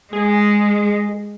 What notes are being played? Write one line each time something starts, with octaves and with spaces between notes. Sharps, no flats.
G#3 G#4